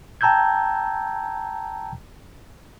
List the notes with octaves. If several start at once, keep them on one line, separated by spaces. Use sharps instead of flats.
G5 A5 A#5 E6 G6 G#6